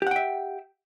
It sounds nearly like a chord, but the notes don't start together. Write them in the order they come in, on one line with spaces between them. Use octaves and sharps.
G4 F#5 G5 E5